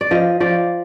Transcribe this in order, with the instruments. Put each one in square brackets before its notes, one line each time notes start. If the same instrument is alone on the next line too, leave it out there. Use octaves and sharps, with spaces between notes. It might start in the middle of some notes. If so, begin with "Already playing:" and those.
[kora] D5
F3 D#5
F3 D5